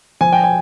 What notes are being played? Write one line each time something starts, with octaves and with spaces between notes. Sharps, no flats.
F3 G#5
G5
G#5